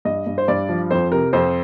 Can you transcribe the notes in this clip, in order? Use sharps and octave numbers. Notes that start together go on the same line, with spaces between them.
G2 D#5
G2
C5
G2 D5
F3
F2 C5
C3 A#4
F2 C5